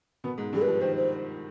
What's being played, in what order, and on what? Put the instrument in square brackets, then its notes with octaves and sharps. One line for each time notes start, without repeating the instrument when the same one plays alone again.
[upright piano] B2 B3
G#2 G#3
[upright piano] G2 G3 [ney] G#4
[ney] B4
[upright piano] F3
[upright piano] D#3 [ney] C5
[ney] C5